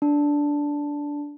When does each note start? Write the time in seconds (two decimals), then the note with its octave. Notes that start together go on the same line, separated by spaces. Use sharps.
0.02 D4